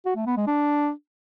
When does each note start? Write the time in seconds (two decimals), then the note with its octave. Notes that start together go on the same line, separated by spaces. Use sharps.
0.06 F#4
0.16 A3
0.26 B3
0.37 G#3
0.47 D4